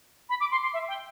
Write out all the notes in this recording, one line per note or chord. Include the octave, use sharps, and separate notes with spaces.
B5
D6
C6
C6
E5
G5